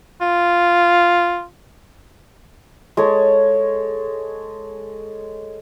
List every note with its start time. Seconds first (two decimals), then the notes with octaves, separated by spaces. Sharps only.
0.21 F4
2.97 G#3 A4 C#5